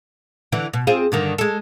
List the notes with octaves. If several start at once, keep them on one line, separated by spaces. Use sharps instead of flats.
D3 E3
B2
C4 F4 G#4
G2 D3 D#3
G#3 A4